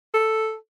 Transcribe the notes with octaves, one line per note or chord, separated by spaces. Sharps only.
A4